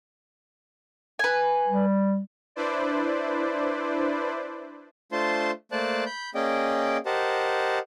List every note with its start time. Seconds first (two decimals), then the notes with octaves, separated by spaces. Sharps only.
1.19 B4 G#5
1.68 G3
2.56 D4 E4 B4 C5 D5
5.12 A3 D4 F4 C5 A5 C6
5.72 A3 A#3 C5 D5 A5 F#6
6.06 B5 G6
6.35 A#3 C#4 G#4 D5 D#5 G5
7.06 G4 A#4 C5 D#5 F#5 A5